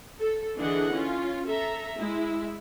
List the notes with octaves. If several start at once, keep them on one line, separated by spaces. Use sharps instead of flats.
A4
D3 E3 D4 G#4 D#5 F#5
C#4 F4
A4 E5 A#5
G#3 E4